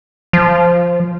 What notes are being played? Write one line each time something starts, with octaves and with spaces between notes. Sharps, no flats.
F3